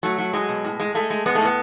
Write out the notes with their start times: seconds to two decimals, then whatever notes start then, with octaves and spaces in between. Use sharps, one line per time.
0.03 F#3 A3
0.18 F#3
0.33 F#3 G#3
0.49 B2
0.64 A2
0.80 G#3
0.95 G#3 A3
1.10 G#3
1.26 G#3 B3
1.35 A3
1.41 A2 B3